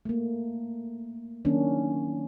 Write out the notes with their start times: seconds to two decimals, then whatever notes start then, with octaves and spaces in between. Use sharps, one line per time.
0.05 A3 A#3
1.45 D#3 F#3 A#3 C#4 D4